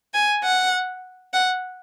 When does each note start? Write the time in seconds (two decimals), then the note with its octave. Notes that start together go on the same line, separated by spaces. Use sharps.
0.14 G#5
0.44 F#5
1.33 F#5